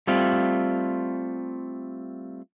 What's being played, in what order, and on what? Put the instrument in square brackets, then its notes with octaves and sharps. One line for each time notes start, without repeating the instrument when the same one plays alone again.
[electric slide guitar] G3 A3 C4 F4